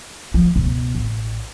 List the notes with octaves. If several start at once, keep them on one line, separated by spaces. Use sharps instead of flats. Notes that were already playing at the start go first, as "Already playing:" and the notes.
F3
C#2 B2
A1